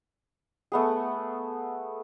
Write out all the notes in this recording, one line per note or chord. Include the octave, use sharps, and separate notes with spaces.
A3 B3 G#4